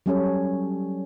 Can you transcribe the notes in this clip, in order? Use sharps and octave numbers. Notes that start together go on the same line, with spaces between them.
F#3 G3 C#4 G4 A4 C#5